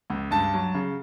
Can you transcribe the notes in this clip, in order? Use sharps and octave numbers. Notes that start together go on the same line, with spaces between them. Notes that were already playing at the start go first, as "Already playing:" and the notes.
C#2
G2 A5
F#3
C#3